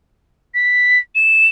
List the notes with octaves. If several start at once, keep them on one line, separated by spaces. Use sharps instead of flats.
B6
E7